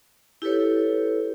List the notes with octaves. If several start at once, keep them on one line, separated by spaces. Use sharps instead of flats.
E4 G4 A4 B4 C#5